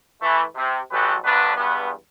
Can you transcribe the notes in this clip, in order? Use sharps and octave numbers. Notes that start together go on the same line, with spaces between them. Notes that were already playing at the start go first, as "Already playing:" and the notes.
E3 A3
C3
A1 F#3 G#3 G4 A4 B4
D2 G2 F#3 B3 D4 B4
E2 G2 G#3 B3